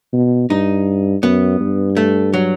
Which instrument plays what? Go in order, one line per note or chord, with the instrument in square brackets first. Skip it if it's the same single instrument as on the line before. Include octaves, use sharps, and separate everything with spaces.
[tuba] B2
[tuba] G2 [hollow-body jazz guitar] D#4
[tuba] F#2 [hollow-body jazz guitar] B3
[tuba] G2
[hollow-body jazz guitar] A3
F#3